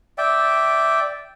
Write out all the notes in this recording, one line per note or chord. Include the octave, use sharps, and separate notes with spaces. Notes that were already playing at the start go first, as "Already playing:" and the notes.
D5 E5 G5